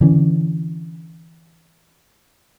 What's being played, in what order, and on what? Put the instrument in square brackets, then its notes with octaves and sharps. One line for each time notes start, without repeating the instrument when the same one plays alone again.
[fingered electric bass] D3 E3 C#4